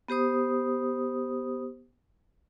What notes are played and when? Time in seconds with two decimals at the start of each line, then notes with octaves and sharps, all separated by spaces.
0.08 B3 G4 C5 D#6